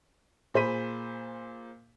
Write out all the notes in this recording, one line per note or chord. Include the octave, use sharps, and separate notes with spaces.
A#2 G#4 C5 B5 B6 D#7